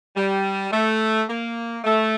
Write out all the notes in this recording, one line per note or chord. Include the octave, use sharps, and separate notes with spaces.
G3
A3
A#3
A3